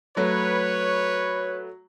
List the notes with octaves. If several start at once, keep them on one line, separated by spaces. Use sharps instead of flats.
F#3 A3 B4 C#5